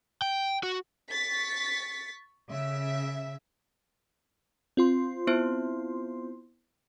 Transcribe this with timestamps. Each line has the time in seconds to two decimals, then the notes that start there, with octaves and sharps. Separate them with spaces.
0.22 G5
0.63 F#4
1.10 C#6 A6 B6
2.47 C#3 E5
4.77 C4 F4 C6
5.27 B3 E4 C5